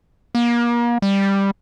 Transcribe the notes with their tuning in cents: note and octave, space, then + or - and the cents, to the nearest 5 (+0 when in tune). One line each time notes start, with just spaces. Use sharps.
A#3 +35
G3 +10